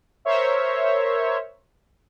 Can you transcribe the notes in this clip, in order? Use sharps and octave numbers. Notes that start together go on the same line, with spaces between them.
A#4 C5 C#5 E5